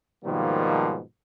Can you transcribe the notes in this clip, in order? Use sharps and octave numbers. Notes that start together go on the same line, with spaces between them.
G#2 B2 D#3 F3 G3 A#3